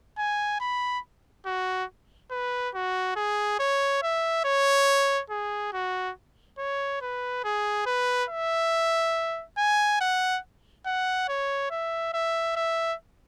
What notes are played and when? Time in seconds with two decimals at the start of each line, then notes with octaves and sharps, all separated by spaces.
0.18 G#5
0.60 B5
1.46 F#4
2.31 B4
2.75 F#4
3.16 G#4
3.59 C#5
4.03 E5
4.45 C#5
5.30 G#4
5.73 F#4
6.58 C#5
7.01 B4
7.44 G#4
7.86 B4
8.29 E5
9.58 G#5
10.01 F#5
10.86 F#5
11.29 C#5
11.71 E5
12.14 E5
12.56 E5